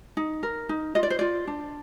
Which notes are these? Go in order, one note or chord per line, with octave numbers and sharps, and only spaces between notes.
D#4
A#4
D#4
F4 D#5
D5
C5
F4 D5
D4